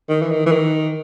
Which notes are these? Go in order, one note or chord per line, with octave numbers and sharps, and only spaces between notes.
D#3
E3
D#3
E3
D#3